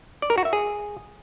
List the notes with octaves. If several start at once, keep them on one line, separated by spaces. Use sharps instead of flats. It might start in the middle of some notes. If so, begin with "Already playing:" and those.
D5
A#4
F#4
E5
G#4